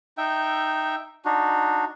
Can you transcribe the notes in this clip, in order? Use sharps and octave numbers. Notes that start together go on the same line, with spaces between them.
D#4 E5 G5
D4 D#4 F#4